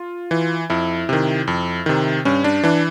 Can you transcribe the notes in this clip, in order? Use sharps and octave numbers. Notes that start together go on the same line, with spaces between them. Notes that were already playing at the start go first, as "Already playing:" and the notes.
Already playing: F4
E3
F2 E4
C3 D#3
F2
C3 D#3
G2 C#4
D4
E3 D4